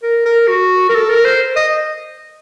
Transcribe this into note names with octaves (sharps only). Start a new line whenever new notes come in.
A#4
A#4
F#4
A#4
A4
A#4
C5
D#5